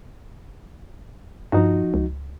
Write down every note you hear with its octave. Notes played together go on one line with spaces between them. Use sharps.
G2 F3 D#4 F#4
C#2